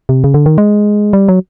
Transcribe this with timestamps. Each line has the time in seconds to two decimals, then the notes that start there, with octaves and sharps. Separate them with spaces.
0.09 C3
0.24 C#3
0.34 D3
0.46 D#3
0.58 G#3
1.13 G3
1.28 F#3